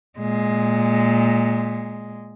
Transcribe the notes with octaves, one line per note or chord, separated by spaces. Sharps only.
A#2 G#3